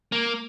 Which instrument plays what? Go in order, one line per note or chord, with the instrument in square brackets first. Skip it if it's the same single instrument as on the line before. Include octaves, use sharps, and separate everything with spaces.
[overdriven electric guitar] A#3